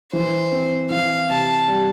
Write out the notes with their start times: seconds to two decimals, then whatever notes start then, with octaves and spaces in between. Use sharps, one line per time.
0.13 E3 C5
0.52 C4
0.90 E3 F5
1.30 C3 A5
1.68 G3